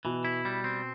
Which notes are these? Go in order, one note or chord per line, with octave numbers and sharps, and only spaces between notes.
B2 E3
E4
G3
C4